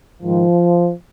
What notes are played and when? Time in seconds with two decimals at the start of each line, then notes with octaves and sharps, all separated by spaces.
0.21 G#2 D#3 F3